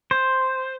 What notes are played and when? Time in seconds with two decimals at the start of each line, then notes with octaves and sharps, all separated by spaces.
0.11 C5